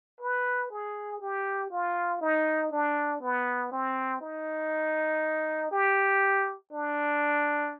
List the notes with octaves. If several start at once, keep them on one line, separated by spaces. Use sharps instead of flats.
B4
G#4
G4
F4
D#4
D4
B3
C4
D#4
G4
D4